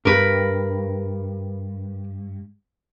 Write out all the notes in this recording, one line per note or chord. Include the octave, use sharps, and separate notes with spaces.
G2 A#4 B4